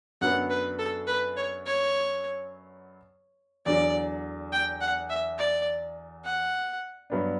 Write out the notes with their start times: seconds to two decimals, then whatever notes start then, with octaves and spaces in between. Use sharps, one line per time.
0.21 F#2 D3 F#3 B3 F#5
0.50 B4
0.79 A4
1.07 B4
1.36 C#5
1.66 C#5
3.66 E2 D3 F#3 D5
4.52 G5
4.81 F#5
5.10 E5
5.38 D5
6.24 F#5
7.10 G2 F#3 B3 D4